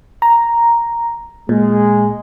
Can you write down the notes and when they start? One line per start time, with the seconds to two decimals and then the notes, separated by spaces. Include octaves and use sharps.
0.22 A#5
1.49 A#2 G#3